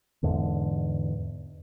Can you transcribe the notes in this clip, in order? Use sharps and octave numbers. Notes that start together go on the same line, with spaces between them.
E2 G#2 D3